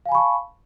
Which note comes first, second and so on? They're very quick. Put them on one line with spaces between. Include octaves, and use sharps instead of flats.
F5 G#5 B5 C#6 A5